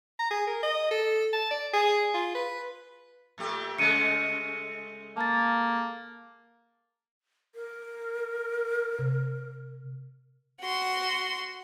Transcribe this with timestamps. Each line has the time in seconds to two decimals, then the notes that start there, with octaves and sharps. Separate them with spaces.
0.19 A#5
0.30 G#4
0.47 A#4
0.63 D#5
0.91 A4
1.33 A5
1.51 D5
1.73 G#4
2.14 F4
2.35 B4
3.38 A#2 A3 G4
3.78 C#3 G#3 A3 C#7 D#7
5.17 A#3 A5 A6
7.55 A#4
8.99 C3
10.61 F#4 C6